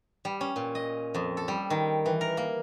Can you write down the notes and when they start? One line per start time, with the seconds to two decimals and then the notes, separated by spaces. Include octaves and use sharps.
0.25 G3
0.41 C#4
0.56 A#2
0.75 D#5
1.15 F2
1.37 A4
1.48 G3
1.70 D#3
2.06 E3
2.21 A#4
2.37 A#3